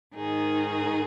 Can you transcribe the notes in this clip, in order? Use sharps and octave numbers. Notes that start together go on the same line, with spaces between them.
G#2 D#3 D#4 G#4